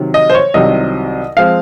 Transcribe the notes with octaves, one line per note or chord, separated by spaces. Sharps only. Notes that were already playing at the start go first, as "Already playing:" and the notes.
Already playing: C3 D#3 F#3
D#5
C5
C#5
C2 C3 D#3 F#3 D#5
F3 G#3 C4 F5